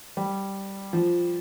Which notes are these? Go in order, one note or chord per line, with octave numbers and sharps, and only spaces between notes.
G3
F3